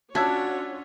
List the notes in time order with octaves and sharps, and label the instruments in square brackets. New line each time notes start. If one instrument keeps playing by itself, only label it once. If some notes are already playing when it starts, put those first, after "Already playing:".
[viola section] C#4 F4 C#5 [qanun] D4 [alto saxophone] F#4 [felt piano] E6 G#6 B6